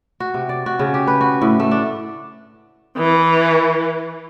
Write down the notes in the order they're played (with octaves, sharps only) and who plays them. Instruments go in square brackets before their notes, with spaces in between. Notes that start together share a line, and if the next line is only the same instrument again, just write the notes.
[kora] F#4
C3
D5
F#4
C#3
G4
B4
F#4
A2
A3
D4
[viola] E3